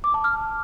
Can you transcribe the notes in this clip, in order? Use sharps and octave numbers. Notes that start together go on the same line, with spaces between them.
D6
A5
F6